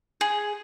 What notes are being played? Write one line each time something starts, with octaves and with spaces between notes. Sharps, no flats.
G#4